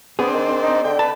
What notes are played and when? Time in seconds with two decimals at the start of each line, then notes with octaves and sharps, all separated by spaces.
0.19 B3 C4 D4 G#4
0.33 D#3
0.62 D#4
0.84 D3 G5
0.99 B4 A5